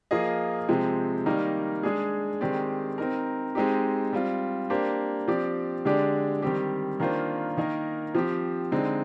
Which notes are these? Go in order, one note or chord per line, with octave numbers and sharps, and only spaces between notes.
F3 A#3 F4 G#4 D#5
C3 F3 G#3 C4
D#3 G3 A#3 D#4 A#4
G#3 D4 G#4
D#3 G#3 C4 G4 D5
C4 D#4 A#4
G#3 C4 D#4 G4
G3 C4 F4
A#3 D4 G4 C5
F3 C4 G4 D5
D3 G#3 D4 G4 D5
D#3 G3 C4 G4
D#3 A#3 D4 F4 C5
D#3 A#3 D#4 A#4
F3 C4 G4
D3 G#3 C4 D#4